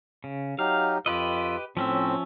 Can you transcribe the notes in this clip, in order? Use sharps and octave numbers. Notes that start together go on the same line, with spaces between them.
C#3
F#3 D#4 G4 F5
F2 F4 G4 B4 D#5 E6
A2 F3 C4 C#4 E5